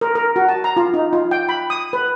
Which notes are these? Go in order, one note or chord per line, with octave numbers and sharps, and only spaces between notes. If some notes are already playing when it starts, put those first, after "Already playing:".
A#4
A#4
F#4
A5
A#5
F4
D#4
F4
G5
B5
D#6
B4